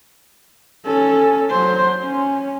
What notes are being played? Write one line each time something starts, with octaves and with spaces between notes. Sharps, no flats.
C#4 A4
F#3 C5
C#4